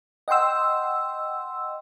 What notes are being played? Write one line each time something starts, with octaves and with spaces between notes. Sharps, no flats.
D#5 F#5 G5 C6 E6